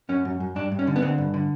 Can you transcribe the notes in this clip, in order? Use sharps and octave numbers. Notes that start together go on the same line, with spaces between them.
F#2 C#4
F#2
F#2
G2 D4
G2
C#4
D3
B3
D3 C4
G2
D3